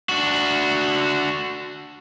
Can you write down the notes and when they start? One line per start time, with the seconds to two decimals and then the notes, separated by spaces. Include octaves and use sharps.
0.09 D4 F#4